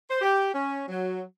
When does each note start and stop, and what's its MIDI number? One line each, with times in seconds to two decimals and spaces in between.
0.10 0.19 72
0.21 0.52 67
0.53 0.84 61
0.88 1.21 54